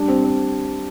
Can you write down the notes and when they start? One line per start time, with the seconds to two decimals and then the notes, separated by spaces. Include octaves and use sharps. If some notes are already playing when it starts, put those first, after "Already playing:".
Already playing: G3 D4
0.08 C4
0.24 C4